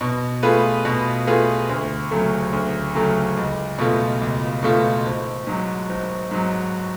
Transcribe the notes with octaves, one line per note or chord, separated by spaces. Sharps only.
B2
A3 F4 G#4 B4
B2
A3 F4 G#4 B4
D2
C#3 F#3 A3
D2
C#3 F#3 A3
C#2
B2 A3 F4
C#2
B2 A3 F4
G#1
G#2 F#3
G#1
G#2 F#3